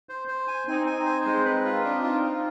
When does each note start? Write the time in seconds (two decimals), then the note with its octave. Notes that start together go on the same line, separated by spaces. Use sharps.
0.09 C5
0.28 C5
0.48 G#5
0.67 C4 D#4 G#5
0.86 G#5
1.06 C5
1.26 G#3
1.45 B4
1.65 F4
1.84 D4
2.03 F4
2.23 F4